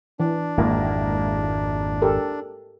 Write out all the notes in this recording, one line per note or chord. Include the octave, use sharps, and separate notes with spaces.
E3 D4
G#1 F2 G#2 A#3 E4
G4 A4 A#4